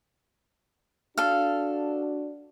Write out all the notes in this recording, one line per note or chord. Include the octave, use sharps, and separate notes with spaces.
D4 F#4 A4 F5